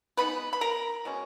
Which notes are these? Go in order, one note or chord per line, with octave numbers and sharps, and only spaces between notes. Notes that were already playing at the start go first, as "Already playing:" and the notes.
B2 G#3 B3 D#4 B4 B5
B5
A#4 A#5
B2 G#3 C#4